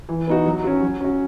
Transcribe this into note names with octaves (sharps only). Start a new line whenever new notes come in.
E3
B3 D#4 F#4
F#3
C#4 F#4
F#3
C#4 F#4